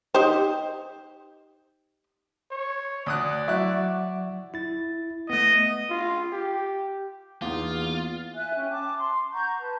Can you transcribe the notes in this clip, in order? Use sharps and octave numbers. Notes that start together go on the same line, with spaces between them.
D#4 G4 C5
C#5
D2 D5 D#6 F#6
F#3 E4 F#5 C#6 F#6
E4 A6
A3 B3 D#5
F4
G4
E2 A#3 B3 D#4 F4
E5 G#5 F#6
C#4 G5
A5 D6
C6
F#5 A#5 C#6 G6
B4 A5